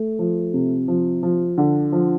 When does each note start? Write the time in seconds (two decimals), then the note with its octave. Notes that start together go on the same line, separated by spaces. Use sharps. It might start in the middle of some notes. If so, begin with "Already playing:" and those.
Already playing: A3
0.19 F3
0.54 C3
0.88 F3
1.23 F3
1.58 D3
1.92 F3